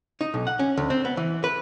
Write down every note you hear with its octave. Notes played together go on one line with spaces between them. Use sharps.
D#4
B1
F#5
C#4
D2
C4
B3
E3
B4